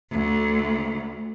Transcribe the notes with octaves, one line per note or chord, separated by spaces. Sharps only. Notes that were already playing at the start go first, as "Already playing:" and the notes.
D2